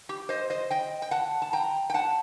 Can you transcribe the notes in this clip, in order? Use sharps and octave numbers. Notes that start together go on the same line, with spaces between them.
G4
C5 D#5
C5 D#5
D#5 G5
G5
F#5 A5
A5
G5 A#5
G5
F#5 A5